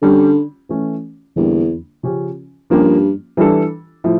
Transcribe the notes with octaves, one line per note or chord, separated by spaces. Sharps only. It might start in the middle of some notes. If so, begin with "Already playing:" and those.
D3 G3 C#4 G4
E3 A3 C#4
E2 D3 G3 A#3
C#3 F3 C#4 G4
G2 F3 A#3 C#4 G4
E3 G3 D4 A4
A2 F3 E4